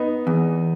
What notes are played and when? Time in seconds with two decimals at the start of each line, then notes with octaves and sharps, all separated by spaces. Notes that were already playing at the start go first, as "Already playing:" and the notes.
Already playing: B3 D#4
0.27 E2